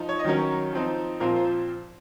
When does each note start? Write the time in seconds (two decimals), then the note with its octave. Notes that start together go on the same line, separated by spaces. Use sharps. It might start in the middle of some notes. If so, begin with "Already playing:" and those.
Already playing: F3 D#4
0.09 C#5
0.19 D#5
0.25 D#3 F#3 C#4 A#4 C#5
0.73 F3 C4 D#4
1.20 A#2 F3 C4 F4 A#4
1.36 C5